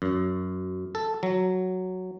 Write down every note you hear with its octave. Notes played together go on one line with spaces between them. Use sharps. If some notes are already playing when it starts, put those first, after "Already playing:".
F#2
A4
F#3